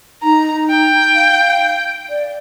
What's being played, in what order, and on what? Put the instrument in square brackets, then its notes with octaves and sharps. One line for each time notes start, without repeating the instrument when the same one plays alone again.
[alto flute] D#4 [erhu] A#5
[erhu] G5
[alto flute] F5
D5